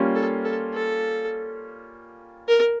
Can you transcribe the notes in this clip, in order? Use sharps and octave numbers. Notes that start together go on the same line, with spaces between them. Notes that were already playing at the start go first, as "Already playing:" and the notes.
Already playing: G3 A#3 C#4 F4
A4
A4
A4
A#4